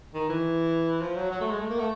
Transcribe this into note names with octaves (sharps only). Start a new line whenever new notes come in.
D#3
E3
F3
F#3
F#3
A3
G#3
A3
A#3
A3